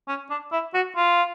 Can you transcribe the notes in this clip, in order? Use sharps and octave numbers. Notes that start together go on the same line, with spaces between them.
C#4
D4
E4
F#4
F4